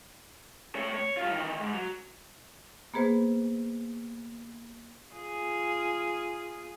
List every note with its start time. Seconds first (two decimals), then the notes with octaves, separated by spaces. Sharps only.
0.75 A3 C#5
0.94 C#5
1.17 G3 F4
1.31 D#3 E3
1.60 G#2
1.74 F#3
2.94 A#3 B3 G#4 B4 C5
5.13 F4 G#4